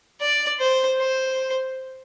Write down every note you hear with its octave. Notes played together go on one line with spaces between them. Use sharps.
D5
C5
C5